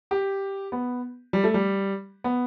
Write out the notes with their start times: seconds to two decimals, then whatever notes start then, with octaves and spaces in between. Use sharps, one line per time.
0.11 G4
0.72 B3
1.33 G3
1.44 A3
1.54 G3
2.24 B3